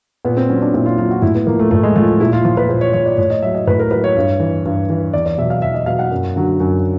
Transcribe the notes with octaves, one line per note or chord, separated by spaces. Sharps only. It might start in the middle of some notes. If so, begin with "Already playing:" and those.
A#2 B3
C4
F#3 C#4
D4
A#2 E4
F4
F#3 F4
F#4
A2 E4
B3
F3 A#3
A3
A2 A3
G#3
F3 A3
A#2 E4
F4
F3 F4
B4
A#2 C5
C#5
F3 C#5
D5
A2 C#5
D#5
F#3 E5
D#5
A2 B4
A#4
F#3 B4
C#5
G2
E3
G2
E3
E2 D5
D5
B2 F#3 E5
F5
E2 E5
D#5
B2 F#3 F5
F#5
F#2
D3 F#3
F#2